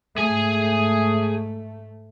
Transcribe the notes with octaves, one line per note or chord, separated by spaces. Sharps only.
G#2 A3 G#4 G#5